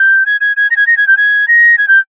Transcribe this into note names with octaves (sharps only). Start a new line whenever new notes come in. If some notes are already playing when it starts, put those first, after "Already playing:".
Already playing: G6
G#6
G#6
G#6
A#6
G#6
A#6
G#6
G6
G#6
A#6
G#6
G6